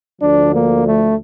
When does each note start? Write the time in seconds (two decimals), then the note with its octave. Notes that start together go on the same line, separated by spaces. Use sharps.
0.20 D2 D3 F3 D4
0.53 A#3
0.84 A3